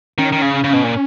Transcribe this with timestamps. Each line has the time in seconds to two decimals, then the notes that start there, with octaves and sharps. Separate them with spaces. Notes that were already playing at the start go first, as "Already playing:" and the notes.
0.18 D#3 C#4
0.33 D#3
0.42 C#3
0.64 C#3
0.73 B2
0.84 A#2